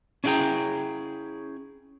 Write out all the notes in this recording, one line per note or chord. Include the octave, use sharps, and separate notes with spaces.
C#4 D4 E4 G#4 G5 A#5